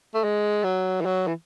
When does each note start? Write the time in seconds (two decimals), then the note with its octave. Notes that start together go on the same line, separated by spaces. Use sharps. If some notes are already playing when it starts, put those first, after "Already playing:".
0.14 A3
0.24 G#3
0.64 F#3
1.01 E3
1.05 F#3
1.27 E3